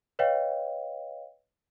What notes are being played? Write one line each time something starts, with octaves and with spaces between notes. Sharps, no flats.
B4 C#5 D#5 F5 G5